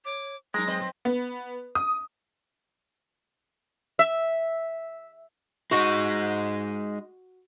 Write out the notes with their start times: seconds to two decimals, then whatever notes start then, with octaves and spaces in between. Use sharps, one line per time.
0.05 C#5 D6
0.54 F#3 G#3 D#4 F#4 A#4 A#6
0.67 C4 B4 D#5
1.05 B3
1.75 D#6
3.99 E5
5.71 G#3 D#4 F#4